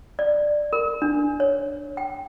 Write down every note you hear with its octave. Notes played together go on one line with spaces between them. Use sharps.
D5
A#4
D4
C#5
G5